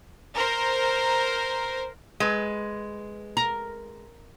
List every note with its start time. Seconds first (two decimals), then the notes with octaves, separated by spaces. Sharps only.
0.35 A#4 C5
2.20 G#3 B4
3.37 A#4